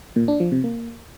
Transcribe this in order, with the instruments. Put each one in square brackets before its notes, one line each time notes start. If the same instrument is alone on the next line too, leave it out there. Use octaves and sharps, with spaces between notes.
[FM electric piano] A#2
D4
F3
C3
A#3